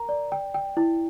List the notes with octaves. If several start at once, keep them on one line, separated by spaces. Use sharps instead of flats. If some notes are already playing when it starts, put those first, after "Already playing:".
Already playing: A#4 A#5
D5
G5
G5
E4